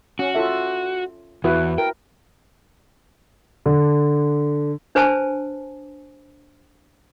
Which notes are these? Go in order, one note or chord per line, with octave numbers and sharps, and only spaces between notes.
C#4 F#4
F4 A4 E5
E2 E4 F#4 B4
A#4 G5
D3
D4 B4 C5 G#5 A5